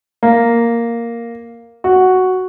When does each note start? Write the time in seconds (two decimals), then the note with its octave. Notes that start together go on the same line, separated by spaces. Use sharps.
0.23 A#3
1.84 F#4